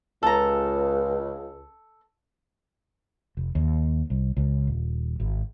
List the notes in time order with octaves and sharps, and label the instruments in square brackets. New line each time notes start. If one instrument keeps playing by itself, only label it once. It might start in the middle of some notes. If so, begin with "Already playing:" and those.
[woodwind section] C#2 [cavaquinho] A4 A#5
[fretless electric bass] F1
D#2
C2
C#2
D#1
G#1